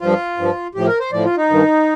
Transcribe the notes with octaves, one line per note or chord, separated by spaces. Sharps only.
G2 F3 F4
G2 F3
A2 F3 G4
A#4
C5
A2 F3 D5
F4
D#4
G2 D#3